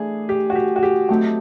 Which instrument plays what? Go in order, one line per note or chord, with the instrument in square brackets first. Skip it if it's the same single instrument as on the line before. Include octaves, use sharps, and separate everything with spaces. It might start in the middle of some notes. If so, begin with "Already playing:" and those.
Already playing: [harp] E3 A3 D4 [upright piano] G#4
[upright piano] G4
F#4
G4
F#4
G4
[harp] F#3 A3 C4 D#4 G4 [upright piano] F#4